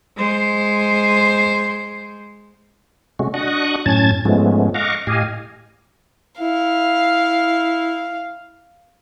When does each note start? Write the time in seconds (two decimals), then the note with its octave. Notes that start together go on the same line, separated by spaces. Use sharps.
0.17 G#3 C5
3.19 C3 G#3 A3 C#4 F#4
3.34 D4 F#4 D#5 C#6 D#6 F#6
3.86 F#2 A2 C#4 A5 G#6 A6
4.25 G#2 F3 G#3 A3 B3 C#4
4.74 D#5 F5 F#5 A#5 C#6 D6
5.07 A2 G4 D#5 F5 G#5
6.41 E4 F5